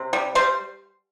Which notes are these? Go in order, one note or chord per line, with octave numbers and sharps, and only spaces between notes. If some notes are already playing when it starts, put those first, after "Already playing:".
Already playing: C3
G3
G3 C5